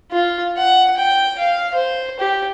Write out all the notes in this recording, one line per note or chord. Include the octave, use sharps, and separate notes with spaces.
F4
F#5
G5
F5
C5
G4